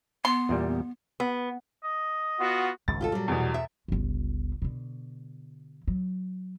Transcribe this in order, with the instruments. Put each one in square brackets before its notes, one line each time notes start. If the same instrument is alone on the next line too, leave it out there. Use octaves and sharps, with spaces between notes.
[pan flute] B3 [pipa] C6
[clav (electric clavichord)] E2 A#2 G3
[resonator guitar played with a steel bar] B3
[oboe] D#5
[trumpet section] B3 F4 F#4
[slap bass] G#1 C#2 F#2 [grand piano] A6
[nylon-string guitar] F4 G4 A4
[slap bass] A#2 [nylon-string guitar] F#3 G3
[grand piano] E2 B2
[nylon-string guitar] E5
[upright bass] G1 C#2
B2 D3
F#3